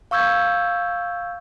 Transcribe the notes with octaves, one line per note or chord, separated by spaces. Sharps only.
F5 C#6 E6 G6 G#6